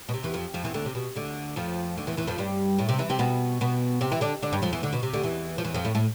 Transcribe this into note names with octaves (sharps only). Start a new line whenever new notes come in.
B2
C3
E2 E3
F2 F3
F2 F3
E2 E3
D2 D3
C3
B2
D2 D3
F2 F3
D2 D3
E2 E3
E2 E3
F2 F3
G2 G3
A2 A3
C3 C4
E3 E4
C3 C4
B2 B3
B2 B3
C3 C4
E3 E4
D3 D4
D3 D4
G2 G3
F2 F3
E2 E3
D2 D3
B2
C3
D2 D3
E2 E3
F3
E2 E3
F2 F3
A2 A3
A2 A3